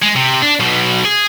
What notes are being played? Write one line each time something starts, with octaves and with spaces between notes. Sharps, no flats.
G#3
C3
D4
B1 B2
G#4